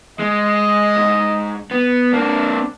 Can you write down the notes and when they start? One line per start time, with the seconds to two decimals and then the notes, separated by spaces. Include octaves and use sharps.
0.19 G#3 D#5
0.96 G#2
1.71 B3
2.13 A#3 C4 D4